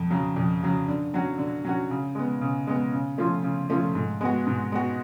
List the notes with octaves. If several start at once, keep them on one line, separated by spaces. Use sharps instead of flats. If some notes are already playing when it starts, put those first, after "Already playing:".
Already playing: F2
C#3 F#3
F2
C#3 F#3
D3
F#3 C#4 F#4
D3
F#3 C#4 F#4
C#3
G#3 B3
C#3
G#3 B3
C#3
F3 A3 C#4 F4
C#3
F3 A3 C#4 F4
G#2
G#3 B3 F#4
G#2
G#3 B3 F#4